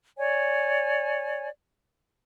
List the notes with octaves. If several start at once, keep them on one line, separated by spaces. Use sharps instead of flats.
C#5 D5 G#5